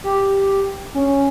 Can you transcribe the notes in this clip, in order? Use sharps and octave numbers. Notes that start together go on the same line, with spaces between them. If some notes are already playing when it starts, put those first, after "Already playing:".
G4
C#4